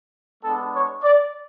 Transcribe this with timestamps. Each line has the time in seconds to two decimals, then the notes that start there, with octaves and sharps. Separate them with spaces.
0.42 G#3 B3 D4 A4
0.71 C#5
1.02 D5